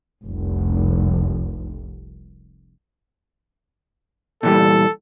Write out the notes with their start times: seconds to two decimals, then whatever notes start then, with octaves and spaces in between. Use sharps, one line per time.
0.23 F1 C2
4.43 A#2 E3 G3 A4